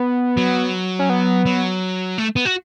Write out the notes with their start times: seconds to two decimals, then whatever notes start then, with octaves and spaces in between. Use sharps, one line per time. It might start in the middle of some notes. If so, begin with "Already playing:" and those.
Already playing: B3
0.37 F#3
0.99 C#4
1.10 B3
1.46 F#3
2.18 A3
2.36 B3
2.45 F#4